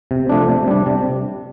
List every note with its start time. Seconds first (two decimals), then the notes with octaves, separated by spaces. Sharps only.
0.11 C3
0.29 F3 A3 D4
0.49 C3
0.67 G3 D4
0.86 C3